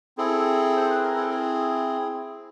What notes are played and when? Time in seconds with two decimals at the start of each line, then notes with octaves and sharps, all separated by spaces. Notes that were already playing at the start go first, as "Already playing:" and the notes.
0.18 C4 E4 G#4 A4
0.77 C5
0.90 B4
1.03 A#4
1.16 A4
1.30 G#4